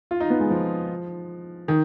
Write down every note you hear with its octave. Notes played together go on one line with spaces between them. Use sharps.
F4
D#4
B3
G#3
F3
D#3